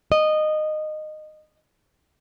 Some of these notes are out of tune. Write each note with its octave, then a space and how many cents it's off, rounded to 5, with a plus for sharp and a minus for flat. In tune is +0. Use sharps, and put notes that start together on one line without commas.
D#5 -15